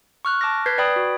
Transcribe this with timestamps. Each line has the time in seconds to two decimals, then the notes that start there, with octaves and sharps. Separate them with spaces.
0.25 C#6 F6 F#6
0.41 A5 D6 F6 A#6
0.66 B4 G6 G#6 B6 C7
0.78 B4 D5 G5 B5 D#6 G#6
0.96 F#4